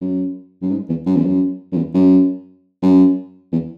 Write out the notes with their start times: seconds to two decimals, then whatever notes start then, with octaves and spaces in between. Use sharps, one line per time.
0.01 F#2
0.62 F#2
0.71 G#2
0.89 E2
1.06 F#2
1.16 E2
1.25 F#2
1.72 F#2
1.76 E2
1.94 F#2
2.82 F#2
3.52 E2